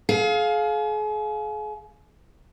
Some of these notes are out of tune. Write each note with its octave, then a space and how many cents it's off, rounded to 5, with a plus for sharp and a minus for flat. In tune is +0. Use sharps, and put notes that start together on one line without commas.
G#4 +40 F5 +10